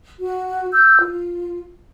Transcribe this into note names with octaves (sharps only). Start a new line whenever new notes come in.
F#4
E6 G6
F4